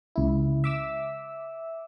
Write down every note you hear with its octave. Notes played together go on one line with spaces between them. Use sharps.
C#2 E4
E5 D6 E6